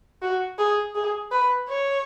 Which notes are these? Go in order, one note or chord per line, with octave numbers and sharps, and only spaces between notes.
F#4
G#4
G#4
B4
C#5